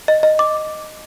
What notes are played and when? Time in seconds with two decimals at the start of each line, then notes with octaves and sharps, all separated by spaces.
0.08 D#5
0.23 D#5
0.39 D6